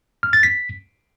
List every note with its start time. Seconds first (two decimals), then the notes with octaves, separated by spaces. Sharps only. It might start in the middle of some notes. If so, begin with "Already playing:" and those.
0.23 F6
0.33 A6
0.43 B6